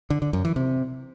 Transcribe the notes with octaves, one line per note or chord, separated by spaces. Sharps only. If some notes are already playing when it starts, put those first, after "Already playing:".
D3
D3
F#2
E3
C3